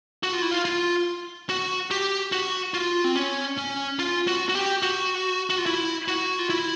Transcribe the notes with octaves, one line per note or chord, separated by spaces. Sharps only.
F#4
F4
E4
F4
F4
F#4
G4
F#4
F4
C4
C#4
C#4
F4
F#4
F#4
G4
F#4
F#4
F4
E4
F#4
F4
E4